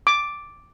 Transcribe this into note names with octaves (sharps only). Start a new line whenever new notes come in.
D6